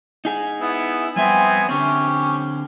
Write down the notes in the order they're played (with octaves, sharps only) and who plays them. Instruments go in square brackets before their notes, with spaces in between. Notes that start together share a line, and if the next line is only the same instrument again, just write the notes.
[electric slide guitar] D#4 G#4
[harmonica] B3 E4
[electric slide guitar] F2 G3 E5 [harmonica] B3 C4 G#5
[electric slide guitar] D3 C4 [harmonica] C#4 G4